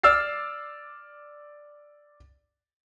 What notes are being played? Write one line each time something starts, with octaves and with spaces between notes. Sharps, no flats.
D5 D6 E6 F6 A6 C7